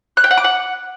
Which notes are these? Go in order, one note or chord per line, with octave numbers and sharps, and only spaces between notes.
F#6
G5
F#5
D6
F#5